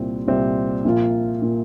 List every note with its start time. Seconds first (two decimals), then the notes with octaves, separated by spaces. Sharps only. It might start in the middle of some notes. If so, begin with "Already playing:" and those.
Already playing: C2 A#2 G3 C4
0.27 C2 A#2 G3 C4
0.85 A#1 A#2 A#3 F4
1.42 A#2 A#3 F4